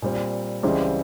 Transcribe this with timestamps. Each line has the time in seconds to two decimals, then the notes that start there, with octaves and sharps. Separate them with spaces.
0.02 A#2 G3 C4
0.63 C#2 C#3 E3 G3 C4